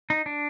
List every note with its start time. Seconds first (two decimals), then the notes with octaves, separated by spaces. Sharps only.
0.10 D#4
0.26 D4